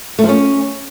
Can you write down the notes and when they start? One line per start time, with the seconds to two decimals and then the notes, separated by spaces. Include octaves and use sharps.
0.19 A3
0.24 F3
0.29 C#4